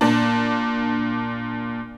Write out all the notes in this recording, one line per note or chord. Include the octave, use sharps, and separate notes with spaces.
A#2 D4